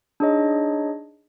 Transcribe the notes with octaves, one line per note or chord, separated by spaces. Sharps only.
D4 D#4 G#4 C#5 D#5